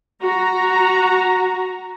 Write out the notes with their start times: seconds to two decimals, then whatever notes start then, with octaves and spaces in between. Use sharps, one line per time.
0.23 F#4 A#5